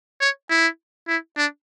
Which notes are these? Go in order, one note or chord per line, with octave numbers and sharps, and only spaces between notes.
C#5
E4
E4
D4